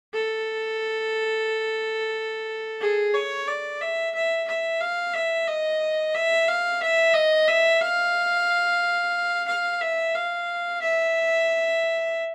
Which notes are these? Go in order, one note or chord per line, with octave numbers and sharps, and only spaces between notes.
A4
G#4
C#5
D5
E5
E5
E5
F5
E5
D#5
E5
F5
E5
D#5
E5
F5
F5
E5
F5
E5